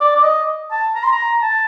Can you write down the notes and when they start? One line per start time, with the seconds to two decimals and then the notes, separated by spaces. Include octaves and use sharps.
0.01 D5
0.16 D5
0.24 D#5
0.71 A5
0.95 A#5
1.04 C6
1.12 A#5
1.42 A5